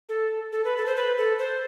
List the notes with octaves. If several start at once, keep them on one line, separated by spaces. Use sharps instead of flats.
A4
A4
B4
A4
C5
B4
A4
C5